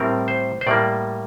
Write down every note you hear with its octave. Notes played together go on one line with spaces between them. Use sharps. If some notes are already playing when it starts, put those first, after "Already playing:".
Already playing: A2 G3 C4 A#4
C5
C5
A2 G3 A#3 D5